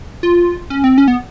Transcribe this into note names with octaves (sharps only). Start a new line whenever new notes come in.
F4
C#4
C4
C#4
B3